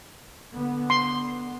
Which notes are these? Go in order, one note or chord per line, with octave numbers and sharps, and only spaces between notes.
D3 B3
C6